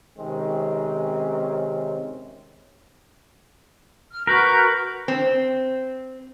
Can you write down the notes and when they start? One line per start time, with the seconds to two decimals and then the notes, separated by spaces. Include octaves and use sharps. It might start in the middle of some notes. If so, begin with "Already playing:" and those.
0.18 C3 D#3 G#3 C4 C#4
4.10 F6
4.27 F#4 A#4 B4 C#6 G6
5.08 C4